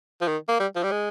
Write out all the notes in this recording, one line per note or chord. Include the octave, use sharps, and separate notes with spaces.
F3
D#3
A#3
G3
F3
G3
G#3